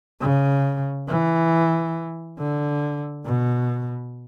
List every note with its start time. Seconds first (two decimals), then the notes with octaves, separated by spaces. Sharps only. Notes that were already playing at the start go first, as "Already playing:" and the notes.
0.21 C#3
1.08 E3
2.39 D3
3.26 B2